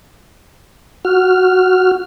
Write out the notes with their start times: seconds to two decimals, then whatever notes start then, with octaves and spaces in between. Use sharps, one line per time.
1.05 F#4 F6